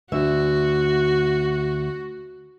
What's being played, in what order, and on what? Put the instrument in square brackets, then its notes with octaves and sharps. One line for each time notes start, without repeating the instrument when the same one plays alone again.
[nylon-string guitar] D2 E5 [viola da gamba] F#4